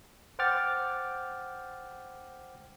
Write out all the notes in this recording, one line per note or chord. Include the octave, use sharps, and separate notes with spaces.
C5 F#5 G5 D6 F6 A6